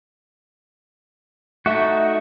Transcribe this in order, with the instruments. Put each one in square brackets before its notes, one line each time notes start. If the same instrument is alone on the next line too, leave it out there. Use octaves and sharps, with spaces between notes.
[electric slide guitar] A3 E5 [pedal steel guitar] D#4 F#4